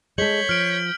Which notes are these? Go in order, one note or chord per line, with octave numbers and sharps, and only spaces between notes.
G#3 A4 C#5 G6 B6 F#7
F3 F6 D7